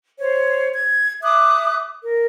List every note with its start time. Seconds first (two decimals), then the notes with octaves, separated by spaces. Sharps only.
0.19 C5 C#5
0.73 G#6
1.23 E5 D6 D#6 F#6
2.04 A#4